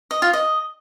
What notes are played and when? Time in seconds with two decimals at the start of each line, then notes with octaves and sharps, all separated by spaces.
0.11 D#5
0.22 F4
0.33 D#5